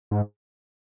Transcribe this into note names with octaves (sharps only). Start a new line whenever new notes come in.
G#2